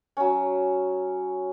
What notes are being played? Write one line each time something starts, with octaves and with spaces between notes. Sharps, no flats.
F#3 C#4